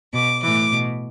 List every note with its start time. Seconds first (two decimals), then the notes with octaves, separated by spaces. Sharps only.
0.13 B2 D6
0.43 A2 E3 D6
0.72 B2